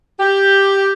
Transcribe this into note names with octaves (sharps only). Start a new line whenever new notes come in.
G4